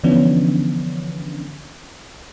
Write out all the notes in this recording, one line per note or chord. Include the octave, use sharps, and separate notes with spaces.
D3 E3 F3 B3 C#4 D4